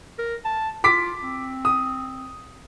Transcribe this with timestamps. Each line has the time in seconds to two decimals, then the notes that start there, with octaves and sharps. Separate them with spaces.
0.18 A#4
0.45 A5
0.84 F4 D6 B6
1.23 C4
1.65 D#6